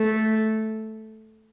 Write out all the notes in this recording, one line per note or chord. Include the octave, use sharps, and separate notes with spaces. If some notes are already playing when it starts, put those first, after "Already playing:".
Already playing: A3